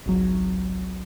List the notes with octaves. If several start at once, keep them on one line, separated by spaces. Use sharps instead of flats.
G#1 C#2 F#3